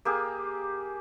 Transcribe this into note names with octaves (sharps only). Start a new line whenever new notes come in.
A#3 G4 G#4